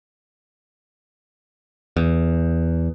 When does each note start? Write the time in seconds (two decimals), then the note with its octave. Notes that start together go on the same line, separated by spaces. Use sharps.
1.97 E2